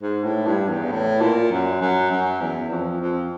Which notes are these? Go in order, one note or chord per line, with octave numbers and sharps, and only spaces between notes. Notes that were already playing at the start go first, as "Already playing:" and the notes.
G#2
A2
G2
E2
A2
A#2
F#2
F#2
F#2
E2
F2
F2